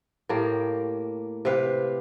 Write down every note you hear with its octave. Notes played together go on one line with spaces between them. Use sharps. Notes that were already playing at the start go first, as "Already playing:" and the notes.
A2 A#3 G4
C3 G4 B4 F5